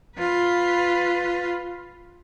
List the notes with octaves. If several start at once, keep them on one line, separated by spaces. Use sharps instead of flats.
F4 B4